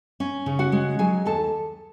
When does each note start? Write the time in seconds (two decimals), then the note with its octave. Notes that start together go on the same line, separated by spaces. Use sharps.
0.20 C#4
0.46 C#3
0.59 F#4 F#5
0.72 G#3
0.99 F#3 G#4 G#5
1.26 D#2 A4 A5